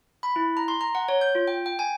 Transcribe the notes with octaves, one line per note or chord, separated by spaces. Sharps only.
B5
E4
A#5
C6
A#5
F#5
C#5
G6
F4
G5
G5
G#5